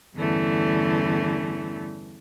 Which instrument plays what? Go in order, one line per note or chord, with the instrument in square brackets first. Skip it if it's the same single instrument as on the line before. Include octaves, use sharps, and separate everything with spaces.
[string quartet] E2 G2 D3 E3 A3 C#4